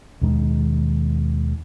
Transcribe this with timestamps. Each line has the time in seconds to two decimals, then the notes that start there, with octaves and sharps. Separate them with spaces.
0.22 D#2 B2 D#3 G#3